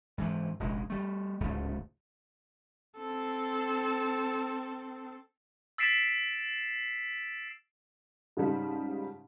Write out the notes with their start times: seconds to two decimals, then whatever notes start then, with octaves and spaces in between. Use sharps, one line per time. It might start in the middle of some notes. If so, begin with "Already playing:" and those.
0.18 G#2 E3 F3
0.60 F1 A#1 G#3
0.90 G3 A3
1.40 D1 C#2 G#2 A3
2.97 C4 A4
5.78 E6 A6 B6 C7 D7 E7
8.37 G#2 C#3 F3 G3 D#4